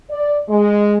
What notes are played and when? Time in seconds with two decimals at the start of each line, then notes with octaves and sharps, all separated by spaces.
0.10 D5
0.49 G#3